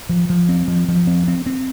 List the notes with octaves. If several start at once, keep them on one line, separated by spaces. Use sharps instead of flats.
F3
F3
C4
F3
F3
C4
C4
C4